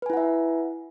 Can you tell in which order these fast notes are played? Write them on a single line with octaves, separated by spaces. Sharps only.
B4 G#5 E4 F#5 E5